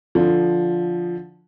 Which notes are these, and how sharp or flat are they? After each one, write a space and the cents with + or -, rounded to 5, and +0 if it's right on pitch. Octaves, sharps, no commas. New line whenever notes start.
D3 +0 F3 +0